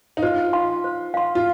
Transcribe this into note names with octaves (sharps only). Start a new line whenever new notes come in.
D#4
F4 C5
F5 C6
C5
F5 C6
F4